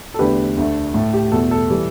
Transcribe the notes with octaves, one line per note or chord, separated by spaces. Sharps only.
A4
E2 D3 A3 G4 B4
D2 D3 A3
A2 A3
G4
E2 B2 A3 A4
A4
E3 G3